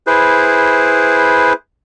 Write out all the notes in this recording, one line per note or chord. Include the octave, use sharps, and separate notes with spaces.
E4 G#4 B4 C5